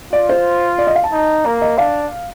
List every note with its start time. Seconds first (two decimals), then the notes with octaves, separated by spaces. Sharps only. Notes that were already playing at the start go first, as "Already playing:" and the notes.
0.13 F4 D5
0.29 C5
0.78 D5
0.87 D#5
0.95 F5
1.04 A5
1.12 D#4
1.45 A#3 A#5
1.62 D#5
1.78 D4 F5